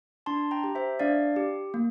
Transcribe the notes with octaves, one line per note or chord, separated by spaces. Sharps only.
D4 A5 C6
G5 A#5
G4
C5 E5
D4 D5 F5
G4
A#3